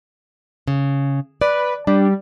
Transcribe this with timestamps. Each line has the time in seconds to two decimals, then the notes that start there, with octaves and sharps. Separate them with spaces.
0.67 C#3
1.41 B4 D5
1.87 G3 D4